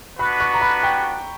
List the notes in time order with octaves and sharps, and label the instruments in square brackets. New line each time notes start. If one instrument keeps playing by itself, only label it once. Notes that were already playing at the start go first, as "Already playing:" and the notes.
[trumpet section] B3 D4 F#4 B4 [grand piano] B5
[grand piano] C#6
A#5
B5
G5